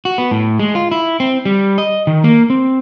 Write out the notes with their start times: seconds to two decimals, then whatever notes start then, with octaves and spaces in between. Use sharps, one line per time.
0.05 F#4
0.18 B3
0.31 A2
0.59 G#3
0.75 F4
0.91 E4
1.20 C4
1.45 G3
1.78 D#5
2.07 D#3
2.24 A#3
2.50 C4